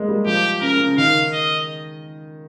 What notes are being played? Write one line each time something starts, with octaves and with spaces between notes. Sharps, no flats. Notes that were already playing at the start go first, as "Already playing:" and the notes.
Already playing: G#3 A#3
G3
F3 G4
C#3 A#4
C#3
D#3 F5
D#5